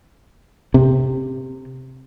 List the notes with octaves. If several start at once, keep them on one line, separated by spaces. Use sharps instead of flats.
C3